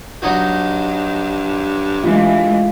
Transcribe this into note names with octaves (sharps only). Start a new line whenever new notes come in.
G2 F#3 D#4 F#4
E3 G#3 A3 F4